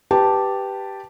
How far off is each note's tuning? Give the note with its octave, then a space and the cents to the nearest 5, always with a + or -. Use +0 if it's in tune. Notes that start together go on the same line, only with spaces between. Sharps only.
G4 +0 B4 +0 A5 +0